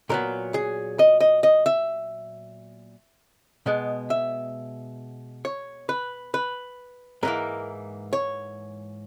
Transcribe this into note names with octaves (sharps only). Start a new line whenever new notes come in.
A#2 F#3 B3 A#4
G#4
D#5
D#5
D#5
E5
B2 G#3 B3
E5
C#5
B4
B4
G#2 E3 A#3 A#4
C#5